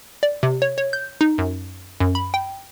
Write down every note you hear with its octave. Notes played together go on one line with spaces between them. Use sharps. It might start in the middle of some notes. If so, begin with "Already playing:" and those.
D5
C3
C#5
C#5
G6
D#4
F#2
F#2
B5
G5